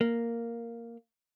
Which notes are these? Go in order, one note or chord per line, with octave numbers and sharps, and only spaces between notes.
A#3